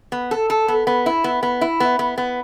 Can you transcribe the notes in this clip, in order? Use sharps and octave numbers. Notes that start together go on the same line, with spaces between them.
B3
A4
A4
B3
B3
E4
B3
B3
E4
B3
B3
B3